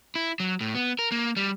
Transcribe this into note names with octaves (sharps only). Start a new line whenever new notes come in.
E4
F#3
A2
B3
A#4
A#3
G3